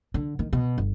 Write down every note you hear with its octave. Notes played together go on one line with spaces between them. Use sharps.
D3
D#3
B2
G1